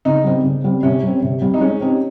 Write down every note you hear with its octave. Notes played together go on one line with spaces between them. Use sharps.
C#3 D#4
G3 C4
C#3
G3 C4
C3 C#4
G3 C4
C3
G3 C4
D#4
G#3 C#4
C4 D#4 G4